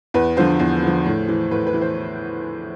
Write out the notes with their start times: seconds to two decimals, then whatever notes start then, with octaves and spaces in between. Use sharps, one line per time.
0.14 E2 B4
0.37 D3 F3 C5
0.60 E2
0.83 D3 F3
1.06 A2
1.28 E3
1.51 A2 B4
1.67 B4
1.74 E3
1.81 C5